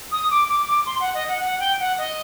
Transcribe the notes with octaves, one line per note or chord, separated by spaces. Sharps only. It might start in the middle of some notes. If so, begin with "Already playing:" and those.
D#6
D6
D6
D6
C6
F#5
D#5
F#5
F#5
G5
F#5
D#5